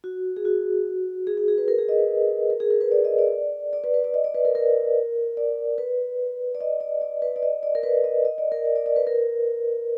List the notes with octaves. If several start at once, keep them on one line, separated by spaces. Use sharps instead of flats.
F#4
G#4
F#4
G#4
G#4
G#4
B4
A#4
G#4
D#5
B4
A#4
G#4
A#4
B4
D5
D#5
D5
D5
B4
B4
D5
D#5
D5
B4
A#4
A#4
D5
B4
D5
D#5
D5
D5
B4
D5
D#5
D5
A#4
B4
D#5
D#5
D5
A#4
D5
D5
D5
B4
A#4